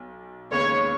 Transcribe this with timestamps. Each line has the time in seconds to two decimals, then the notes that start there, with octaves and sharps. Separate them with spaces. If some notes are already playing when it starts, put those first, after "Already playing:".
Already playing: B1 B2
0.52 D#2 C#3 G#3 B3 C#5